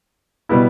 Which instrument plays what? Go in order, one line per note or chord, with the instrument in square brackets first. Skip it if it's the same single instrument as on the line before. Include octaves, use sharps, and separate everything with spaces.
[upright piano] B2 G3 B3 E4